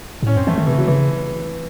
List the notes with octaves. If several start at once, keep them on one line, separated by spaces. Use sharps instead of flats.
G#2
A2 C#4
F#2 C4
E3 A3
D#3
C3 E3
C#3
F#3
C#3 E3